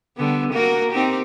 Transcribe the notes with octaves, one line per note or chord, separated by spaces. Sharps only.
D3 G3 B3
A#3 F#4 A#4
C4 D#4 G4